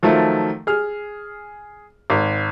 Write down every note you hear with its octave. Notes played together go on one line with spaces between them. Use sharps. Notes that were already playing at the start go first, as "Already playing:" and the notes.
D#3 F3 F#3 A3
G#4 F6
G#1